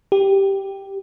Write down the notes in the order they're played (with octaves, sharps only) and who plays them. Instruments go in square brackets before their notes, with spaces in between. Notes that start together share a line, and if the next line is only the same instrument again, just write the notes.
[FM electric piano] G4